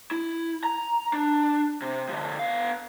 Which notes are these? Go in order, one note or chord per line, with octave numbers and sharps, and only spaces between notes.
E4
A#5
D4
C3
D3 F3
B3 F5